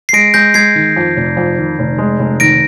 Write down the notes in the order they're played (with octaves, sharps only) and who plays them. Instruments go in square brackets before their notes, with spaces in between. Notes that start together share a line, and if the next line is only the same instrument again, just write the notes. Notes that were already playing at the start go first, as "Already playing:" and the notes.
[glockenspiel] C7
[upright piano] G#3 [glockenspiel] A#6 D7
[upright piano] G#3 [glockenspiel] G6 A#6
[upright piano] G#3 [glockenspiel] G#6 C7
[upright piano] D#3
F2
F1
F2
D#3
F1
G#3
F1
[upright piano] D#3 [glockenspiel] A#6 D7